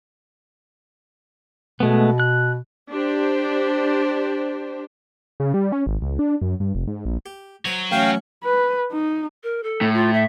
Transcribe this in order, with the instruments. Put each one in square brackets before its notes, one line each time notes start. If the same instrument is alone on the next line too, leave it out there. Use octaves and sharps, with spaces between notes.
[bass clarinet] B2 [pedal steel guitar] G#3 A3 B3
[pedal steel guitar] F#6
[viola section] D4 G4 C5
[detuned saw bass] C#3
G3
C#4
G#1
C#2
D4
F#2
G2
F1
G#2
A#1
[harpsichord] G4
[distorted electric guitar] F#3 C#5 [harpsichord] C5 B5
[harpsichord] A1 F#4 E5 [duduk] C#4 [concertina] F5 G5
[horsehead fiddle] B4
D#4
[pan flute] A#4
A4
[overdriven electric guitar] A2
[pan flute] F4
E5